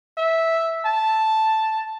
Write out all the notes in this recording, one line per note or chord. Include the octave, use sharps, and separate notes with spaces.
E5
A5